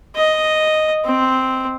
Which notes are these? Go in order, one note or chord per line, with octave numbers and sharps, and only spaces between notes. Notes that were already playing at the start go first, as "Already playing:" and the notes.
D#5
C4